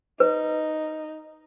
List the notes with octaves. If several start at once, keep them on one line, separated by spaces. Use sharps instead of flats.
D#4 B4